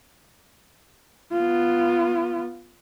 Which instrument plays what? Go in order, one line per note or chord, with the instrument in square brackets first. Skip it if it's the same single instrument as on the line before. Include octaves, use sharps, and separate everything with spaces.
[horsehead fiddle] B3 F4